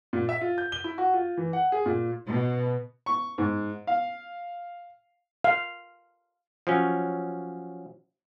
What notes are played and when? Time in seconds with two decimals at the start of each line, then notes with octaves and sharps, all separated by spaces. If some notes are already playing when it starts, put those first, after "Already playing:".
0.13 A#2
0.29 E5
0.41 F4
0.58 G6
0.72 G7
0.84 E4
0.98 F#4
1.14 F4
1.37 E3
1.53 F#5
1.72 G#4
1.86 A#2
2.28 B2
3.06 C#6
3.38 G#2
3.87 F5
5.44 F5
6.67 F3 F#3 C#4